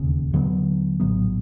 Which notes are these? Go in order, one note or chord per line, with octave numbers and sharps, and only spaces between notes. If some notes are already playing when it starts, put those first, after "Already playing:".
Already playing: E1 D#2 C#3
D#2 D3 F#3 B3
A#1 A2 F#3 B3